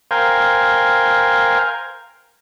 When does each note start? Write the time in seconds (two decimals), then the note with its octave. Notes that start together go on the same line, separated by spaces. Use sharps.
0.11 A#4 C5 F5 G5 G#5